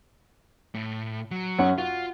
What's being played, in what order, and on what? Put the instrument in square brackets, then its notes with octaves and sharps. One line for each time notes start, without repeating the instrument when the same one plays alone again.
[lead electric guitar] A2
F#3
[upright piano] F#2 C#4 F#5
[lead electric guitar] F4 [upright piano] F#4